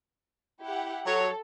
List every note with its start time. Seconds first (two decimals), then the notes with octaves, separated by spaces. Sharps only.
0.65 E4 G4 F#5
1.06 F#3 A4 C#5